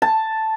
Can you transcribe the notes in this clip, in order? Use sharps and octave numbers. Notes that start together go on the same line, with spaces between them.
A5